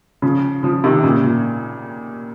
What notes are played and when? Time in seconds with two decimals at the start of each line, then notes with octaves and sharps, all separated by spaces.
0.22 C#3 F3
0.63 C#3 F3
0.84 C3 D#3
1.04 A#2 C#3
1.24 A#2